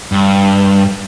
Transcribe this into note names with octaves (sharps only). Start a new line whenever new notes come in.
G2